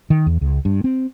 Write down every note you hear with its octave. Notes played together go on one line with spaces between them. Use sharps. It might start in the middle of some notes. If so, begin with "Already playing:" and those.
D#3
E2
C#2
G2
C4